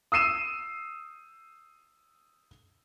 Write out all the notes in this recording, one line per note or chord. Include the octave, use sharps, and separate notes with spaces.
D#6 E6 C7 D#7 E7